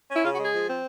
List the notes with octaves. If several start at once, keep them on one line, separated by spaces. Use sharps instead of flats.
C#4
E4
C#3 F4
F#4
G#3 G#4
F3
C4